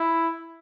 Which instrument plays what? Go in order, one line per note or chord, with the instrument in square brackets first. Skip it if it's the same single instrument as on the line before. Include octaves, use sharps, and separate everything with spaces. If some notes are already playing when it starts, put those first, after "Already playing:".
Already playing: [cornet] E4